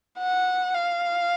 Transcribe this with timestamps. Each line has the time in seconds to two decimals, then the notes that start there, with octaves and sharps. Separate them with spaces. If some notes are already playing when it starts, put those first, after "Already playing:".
0.18 F#5
0.74 F5